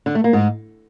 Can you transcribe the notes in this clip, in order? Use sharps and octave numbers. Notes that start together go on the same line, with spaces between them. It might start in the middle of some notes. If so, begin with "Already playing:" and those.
D3
A3
A#3
G#2